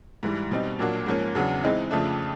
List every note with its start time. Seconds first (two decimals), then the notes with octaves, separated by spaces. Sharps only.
0.23 G#2 E3 G3
0.51 B2 G3 C4 D#4
0.79 A#2 F#3 A#3 D4 F#4
1.06 G#2 F3 A#3 C#4
1.35 E2 C#3 F#3 B3 D4
1.63 E3 G#3 C4 D#4
1.91 F2 C#3 F3 A3 D4